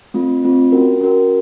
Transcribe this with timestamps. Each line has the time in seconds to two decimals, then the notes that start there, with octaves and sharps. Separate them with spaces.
0.14 A3 C4 F4
0.44 A3 C4 F4
0.72 C#4 F#4 A#4
1.01 C#4 F#4 A#4